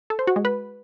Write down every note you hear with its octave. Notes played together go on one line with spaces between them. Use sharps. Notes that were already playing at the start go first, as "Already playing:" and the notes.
A4
C5
F#4
G#3
B4